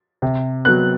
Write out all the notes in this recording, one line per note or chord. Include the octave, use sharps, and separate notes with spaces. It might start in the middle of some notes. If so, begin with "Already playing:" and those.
C3
F#3 B3 F#6